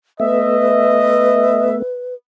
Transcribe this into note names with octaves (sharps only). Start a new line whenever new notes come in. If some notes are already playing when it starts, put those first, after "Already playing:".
A3 B3 B4 D#5 E5